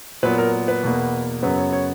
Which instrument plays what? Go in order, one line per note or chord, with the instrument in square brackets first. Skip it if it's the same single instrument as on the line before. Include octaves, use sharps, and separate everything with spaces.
[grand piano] A#2 F#3 B3 B4
A#4
B4
E2 B2 A#3
F#2 C#3 F#3 B3 B4
C#5
C#5